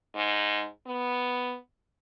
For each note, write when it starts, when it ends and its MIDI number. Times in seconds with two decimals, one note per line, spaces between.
0.15 0.66 44
0.87 1.56 59